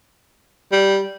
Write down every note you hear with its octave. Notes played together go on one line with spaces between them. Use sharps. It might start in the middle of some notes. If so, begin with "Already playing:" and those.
G3